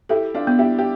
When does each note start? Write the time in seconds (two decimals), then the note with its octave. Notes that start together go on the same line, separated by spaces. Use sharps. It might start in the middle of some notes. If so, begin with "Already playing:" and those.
0.09 E4 G4 A4
0.35 D4 F4
0.47 B3
0.59 E4 G4
0.79 G4